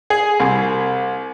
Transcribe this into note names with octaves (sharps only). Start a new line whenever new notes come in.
G#4
C2